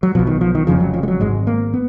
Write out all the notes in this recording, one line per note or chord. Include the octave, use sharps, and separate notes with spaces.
F#3
B1 B2 F3
D#3
F3
D#3
F1 F2 C#3 F3
F#3
F3
G#3
F#3
G#1 G#2 G#3
A#3
B3